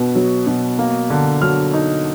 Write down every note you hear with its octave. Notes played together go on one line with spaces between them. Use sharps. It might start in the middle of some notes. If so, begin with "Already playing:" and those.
Already playing: B2 B3
F#3
B2
A#3
D3
F#3 F6
D#4